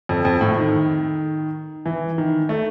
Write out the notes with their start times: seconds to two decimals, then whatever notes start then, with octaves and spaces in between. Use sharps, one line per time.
0.09 F2
0.25 F2
0.41 A2
0.58 D#3
1.86 E3
2.18 D#3
2.49 A3